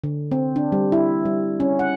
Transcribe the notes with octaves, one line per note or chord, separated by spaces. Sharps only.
D3
C4
D4
G3
E4
G3
C#4
F#5